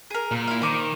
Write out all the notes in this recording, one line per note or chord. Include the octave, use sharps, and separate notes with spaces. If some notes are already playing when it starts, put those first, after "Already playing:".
G#4 A#4
A#2
E4 F5
D#3 C5 D6